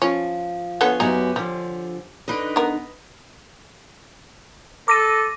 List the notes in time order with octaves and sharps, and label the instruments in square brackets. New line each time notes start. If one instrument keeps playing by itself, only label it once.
[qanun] F3 [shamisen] C#4
[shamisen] D3 B3 A4 [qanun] C#5 G#5 C6
[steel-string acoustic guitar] F#2 B3 F#4 [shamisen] D#4 [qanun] G4 G#5
[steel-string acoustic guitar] D3 F3 [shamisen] G3
[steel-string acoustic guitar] D3 D4 D#4 [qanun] B4 D#5
[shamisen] B3 A#4
[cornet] A4 [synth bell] D6 A#6 D#7